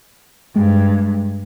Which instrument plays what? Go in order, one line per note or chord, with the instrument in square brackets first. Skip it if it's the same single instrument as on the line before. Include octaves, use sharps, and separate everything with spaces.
[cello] G2 [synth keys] G#3